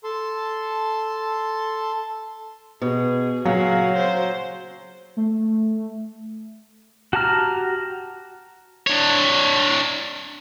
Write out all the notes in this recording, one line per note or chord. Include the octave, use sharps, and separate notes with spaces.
A4 A5 C6
B2 G#4
A#2 C#3 F#3 C#4 F#4 F5
C5
A3
F#4 G4 A5 A#5 F6
D4 C#5